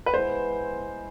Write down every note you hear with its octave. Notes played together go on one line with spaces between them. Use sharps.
B4
G#3 B3 E4 C5